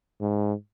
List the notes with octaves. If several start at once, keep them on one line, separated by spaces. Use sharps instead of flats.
G#2